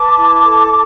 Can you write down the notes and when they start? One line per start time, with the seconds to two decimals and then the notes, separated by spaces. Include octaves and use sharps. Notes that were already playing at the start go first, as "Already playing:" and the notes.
Already playing: B4 A5 D6
0.17 E4
0.44 A4